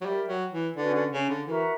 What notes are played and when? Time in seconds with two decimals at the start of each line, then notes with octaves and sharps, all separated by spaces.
0.01 F#3
0.05 G3 G4 A#4 E5 G5
0.28 F#3
0.52 E3
0.77 D3 C#4 F#4 B4 D5
0.94 D3
1.12 C#3
1.29 D3
1.47 E3 F#4 A#4 E5 A#5